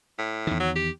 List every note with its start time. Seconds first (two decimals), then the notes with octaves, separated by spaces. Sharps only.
0.19 A2
0.47 E2 D#3
0.60 F#3
0.76 G4